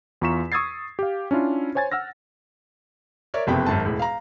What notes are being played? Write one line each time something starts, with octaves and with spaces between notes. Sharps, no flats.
E2 F4 A#5 C#6 B6 E7
C#6 D#6 E6 G#6 A6 C7
G4 F5
C#4 D4 E4 F4
C5 C#5 G#5 G#6 A6
F#5 E6 F6 A#6
A#4 C#5 D5 E5
F#1 F2 C3 B3 G5
G#1 F#2 A5
E1 A2
F5 A#5